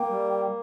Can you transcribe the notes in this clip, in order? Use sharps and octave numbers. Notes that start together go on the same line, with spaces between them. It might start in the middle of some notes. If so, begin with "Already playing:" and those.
Already playing: A#3 G5
G3